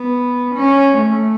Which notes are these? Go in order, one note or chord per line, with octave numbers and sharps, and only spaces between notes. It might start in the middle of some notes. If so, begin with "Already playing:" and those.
Already playing: B3
C#4
A3